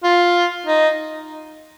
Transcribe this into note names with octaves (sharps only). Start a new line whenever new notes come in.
F4
D#4